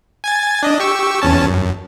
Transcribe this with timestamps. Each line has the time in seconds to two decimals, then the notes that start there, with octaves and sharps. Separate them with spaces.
0.24 G#5 G#6 A6
0.63 D4 D#5
0.80 G4 C#6 E6
1.22 E2 C#4 A5
1.46 F#2